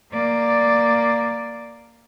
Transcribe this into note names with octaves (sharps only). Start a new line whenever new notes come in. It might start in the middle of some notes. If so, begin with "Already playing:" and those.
A#3 D5